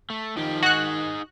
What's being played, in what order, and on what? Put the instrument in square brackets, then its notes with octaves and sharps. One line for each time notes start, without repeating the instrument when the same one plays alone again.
[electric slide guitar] A3
[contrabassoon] D#3 [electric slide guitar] F3 G4
[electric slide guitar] D#4 G#4 [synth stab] F#4 F#6